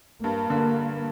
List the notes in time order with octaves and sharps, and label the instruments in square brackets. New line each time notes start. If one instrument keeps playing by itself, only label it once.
[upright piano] G2 [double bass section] A#3
[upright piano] D3